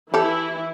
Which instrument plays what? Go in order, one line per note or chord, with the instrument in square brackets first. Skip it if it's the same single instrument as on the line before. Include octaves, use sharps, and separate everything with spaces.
[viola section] E3 E4 [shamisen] G4 A4